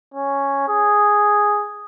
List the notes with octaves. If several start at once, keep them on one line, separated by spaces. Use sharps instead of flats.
C#4
G#4